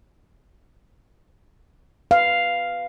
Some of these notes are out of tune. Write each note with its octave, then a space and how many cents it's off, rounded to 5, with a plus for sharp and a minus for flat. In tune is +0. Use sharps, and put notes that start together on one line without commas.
B4 +0 F5 +0